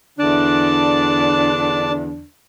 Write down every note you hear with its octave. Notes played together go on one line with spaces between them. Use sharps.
E2 D3 D4 D5 A5